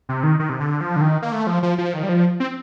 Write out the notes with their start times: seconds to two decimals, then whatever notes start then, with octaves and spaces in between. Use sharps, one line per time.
0.09 C3
0.23 D#3
0.39 D#3
0.49 C3
0.60 D3
0.81 F3
0.96 D3
1.01 D#3
1.22 A#3
1.32 A3
1.47 F3
1.63 F3
1.78 F3
1.93 D#3
2.03 G3
2.09 F3
2.40 C4